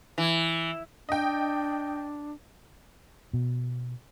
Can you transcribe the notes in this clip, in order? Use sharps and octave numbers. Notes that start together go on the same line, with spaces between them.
E3
D4 D#5 G5
B2